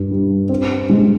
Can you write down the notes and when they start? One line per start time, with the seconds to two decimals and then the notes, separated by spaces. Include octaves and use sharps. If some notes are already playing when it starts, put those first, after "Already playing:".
Already playing: G2
0.11 G3
0.49 C4
0.90 G#3